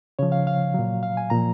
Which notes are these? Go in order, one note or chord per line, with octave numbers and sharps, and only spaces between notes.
C#3 F3 C#5
F5
F5
A#2 F#3
F5
G#5
A#2 F3 A#5